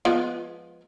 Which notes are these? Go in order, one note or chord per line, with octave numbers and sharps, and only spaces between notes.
F3 G#3 B3